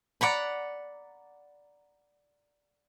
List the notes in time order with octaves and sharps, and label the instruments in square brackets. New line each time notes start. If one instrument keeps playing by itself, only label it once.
[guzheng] D5 F#5 A#5 B5